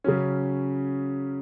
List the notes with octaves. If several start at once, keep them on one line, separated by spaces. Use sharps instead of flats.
C#3 F#3 C#4